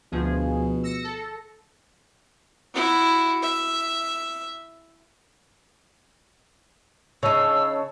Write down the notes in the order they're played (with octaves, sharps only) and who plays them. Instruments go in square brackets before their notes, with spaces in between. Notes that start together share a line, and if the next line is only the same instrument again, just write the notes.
[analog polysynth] D2 F3 G#4 [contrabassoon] B2
[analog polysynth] E6 A#6 C#7
A4
[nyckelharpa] E4 F#4
E5
[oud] C#3 D#4 [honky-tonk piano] C#5 A5 [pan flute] E6